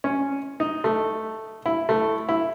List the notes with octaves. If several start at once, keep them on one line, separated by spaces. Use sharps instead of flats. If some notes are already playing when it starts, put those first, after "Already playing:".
C#4
D#4
A3
E4
A3
E4